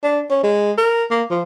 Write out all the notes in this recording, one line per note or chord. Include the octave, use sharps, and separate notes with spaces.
D4
C#4
G#3
A#4
A#3
F3